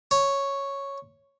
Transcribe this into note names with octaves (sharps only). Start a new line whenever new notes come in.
C#5